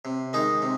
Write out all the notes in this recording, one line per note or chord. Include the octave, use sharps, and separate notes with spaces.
C3
D#3 G#3 D#4
C3